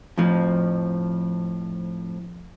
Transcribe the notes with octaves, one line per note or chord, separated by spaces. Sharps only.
F2 A2 F3